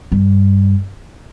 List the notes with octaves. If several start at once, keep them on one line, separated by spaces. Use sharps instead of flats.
G2